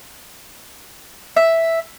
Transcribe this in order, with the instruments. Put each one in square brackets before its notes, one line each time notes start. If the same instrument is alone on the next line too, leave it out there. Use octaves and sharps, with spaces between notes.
[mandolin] E5